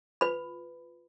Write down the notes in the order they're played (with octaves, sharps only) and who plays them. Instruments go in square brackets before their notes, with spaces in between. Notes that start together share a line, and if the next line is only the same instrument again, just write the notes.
[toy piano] F4 B4 B5